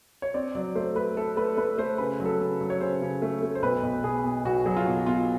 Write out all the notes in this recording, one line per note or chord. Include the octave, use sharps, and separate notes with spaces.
C#5
C4 D5
F#3 D5
A3 C5
A3 B4
A3 A4
A3 B4
A3 B4
A3 C5
C#3 B4
F#3
A4
C#3
F#3
C#5
C#3 C5
C#3
A3
A3
C5
B1 B4
B1
B2 G#4
B2
B1 F#4
F#3 G#4
F4
B1 F#4
B2 F4